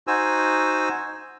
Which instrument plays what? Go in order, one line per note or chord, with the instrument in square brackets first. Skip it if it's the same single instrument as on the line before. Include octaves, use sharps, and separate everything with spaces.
[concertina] D#4 F#4 C5 G#5 E6